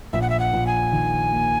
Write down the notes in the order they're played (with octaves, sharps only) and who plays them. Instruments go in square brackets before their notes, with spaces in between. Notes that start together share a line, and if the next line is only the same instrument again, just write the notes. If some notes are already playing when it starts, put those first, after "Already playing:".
[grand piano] A#1 [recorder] E5
[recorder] F#5
E5
F#5
[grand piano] A#1
[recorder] G#5
[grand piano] D#3
A#3